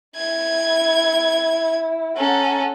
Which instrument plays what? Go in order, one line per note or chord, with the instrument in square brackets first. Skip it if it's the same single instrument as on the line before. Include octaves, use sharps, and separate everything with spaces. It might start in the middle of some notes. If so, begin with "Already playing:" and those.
[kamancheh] E4 [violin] G#6
[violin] C#4 A4 [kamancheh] F#5 A#5